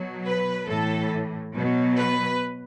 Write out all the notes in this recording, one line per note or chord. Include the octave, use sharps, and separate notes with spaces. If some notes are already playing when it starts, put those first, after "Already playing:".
Already playing: B2 F#3
B4
A2 E3 A4
B2 F#3
B4